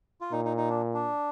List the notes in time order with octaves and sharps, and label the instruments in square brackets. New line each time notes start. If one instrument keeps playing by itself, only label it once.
[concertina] F4
[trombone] A#2 [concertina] D#4
[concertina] D#4
D#4
D4
D4